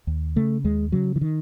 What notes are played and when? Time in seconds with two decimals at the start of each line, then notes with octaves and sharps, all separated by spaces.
0.07 D#2
0.36 C#3 A3
0.64 D#2 G#3
0.92 C#3 F#3
1.16 E3
1.21 D#3